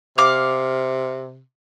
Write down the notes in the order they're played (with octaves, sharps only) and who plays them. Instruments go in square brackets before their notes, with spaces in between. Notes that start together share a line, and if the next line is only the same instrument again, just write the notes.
[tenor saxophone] C3 [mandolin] F5 D6